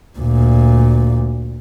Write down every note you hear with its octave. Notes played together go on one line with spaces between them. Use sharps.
D2 A#2